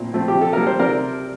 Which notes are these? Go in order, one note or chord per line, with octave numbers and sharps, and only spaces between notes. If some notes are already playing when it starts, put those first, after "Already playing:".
Already playing: A#2 A3 C4
F3 A3 C4
G4
C3
A4
G3 A#3 A#4
C5
C3 A#4 D5